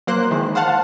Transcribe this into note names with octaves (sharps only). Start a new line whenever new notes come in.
F#3 A#3 C5 F#6
D#3 E3 G#3
C5 F5 F#5 A5